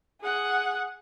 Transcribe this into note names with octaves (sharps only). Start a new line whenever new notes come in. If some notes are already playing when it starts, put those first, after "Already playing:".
G#4 F#5